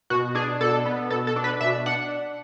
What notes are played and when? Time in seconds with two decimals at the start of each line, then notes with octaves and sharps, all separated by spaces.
0.10 B2 F#4
0.35 D4 G#4
0.61 B2 A4
0.85 B3
1.10 B2 A4
1.27 A4
1.36 D4
1.44 B4
1.61 B2 E5
1.86 D4 F#5